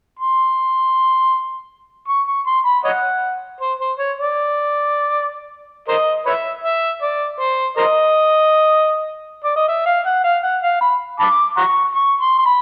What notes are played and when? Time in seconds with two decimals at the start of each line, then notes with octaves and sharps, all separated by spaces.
0.19 C6
2.08 C#6
2.28 C#6
2.47 C6
2.65 B5
2.84 C#5 D#5 F#5
3.60 C5
3.79 C5
3.98 C#5
4.17 D5
5.88 A#4 C5 D#5
6.26 B4 C#5 E5
6.64 E5
7.02 D5
7.40 C5
7.77 A#4 C5 D#5
9.44 D5
9.56 D#5
9.68 E5
9.86 F5
10.06 F#5
10.24 F5
10.43 F#5
10.62 F5
10.81 B5
11.20 A5 B5 D6
11.57 F#5 A#5 C#6
11.95 C#6
12.21 C6
12.39 C6
12.46 B5